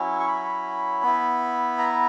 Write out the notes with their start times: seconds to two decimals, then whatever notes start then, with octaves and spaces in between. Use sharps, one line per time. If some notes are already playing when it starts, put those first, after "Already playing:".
Already playing: F#3 C#4 E4
0.20 C#6
0.28 B5
1.03 B3 E4
1.78 A#5